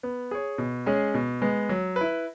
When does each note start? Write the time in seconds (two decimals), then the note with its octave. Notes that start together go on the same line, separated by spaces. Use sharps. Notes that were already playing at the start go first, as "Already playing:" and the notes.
0.03 B3
0.31 G#4 C#5
0.58 B2
0.86 G#3 C#4 G#4 C#5
1.14 B2
1.42 G#3 B3
1.69 F#3
1.96 E4 B4